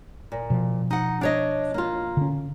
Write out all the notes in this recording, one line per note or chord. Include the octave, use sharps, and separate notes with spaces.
A#2
B2 F3
D#4 F#5
D4 C#5 D#5
A#3 F4
D3 C#4